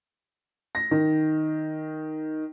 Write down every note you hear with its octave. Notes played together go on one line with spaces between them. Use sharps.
A#6
D#3